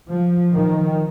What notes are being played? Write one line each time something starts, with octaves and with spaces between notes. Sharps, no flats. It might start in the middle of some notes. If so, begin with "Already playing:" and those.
F3
D#3